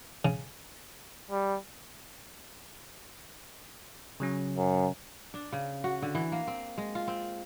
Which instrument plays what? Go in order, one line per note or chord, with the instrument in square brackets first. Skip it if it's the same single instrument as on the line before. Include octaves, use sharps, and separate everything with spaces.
[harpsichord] C#3
[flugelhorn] G3
[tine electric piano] C#3 F#3 C#4
[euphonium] F#2
[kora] D4
C#3
F#4
D3
E3
A#3
C4
G#3
F4
C4